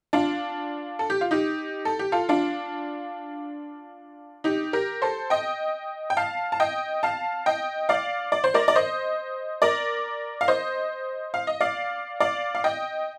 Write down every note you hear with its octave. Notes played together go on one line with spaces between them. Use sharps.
D4 F4
A4
G4
F4
D#4 G4
A4
G4
F4 A4
D4 F4
D#4 G4
G4 A#4
A4 C5
D#5 G5
G5
F5 A5
A5
D#5 G5
F5 A5
D#5 G5
D5 F5
D5
C5
A#4 D5
D5
C5 D#5
A#4 D5
F5
C5 D#5
F5
D#5
D5 F5
D5 F5
F5
D#5 G5